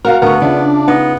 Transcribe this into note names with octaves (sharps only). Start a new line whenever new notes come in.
F#4 A#4 F5 F#5
D2 B3 A#4 C#6
C#3 D4 F4 E5
B3 D#4